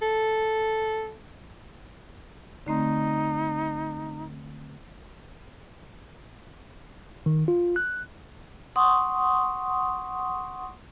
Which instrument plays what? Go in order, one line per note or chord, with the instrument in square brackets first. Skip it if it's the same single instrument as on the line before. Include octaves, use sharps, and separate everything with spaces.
[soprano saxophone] A4
[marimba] D3 A3 C4 [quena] D#4
[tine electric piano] D#3
F4
F#6
[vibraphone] F#5 C6 C#6 D#6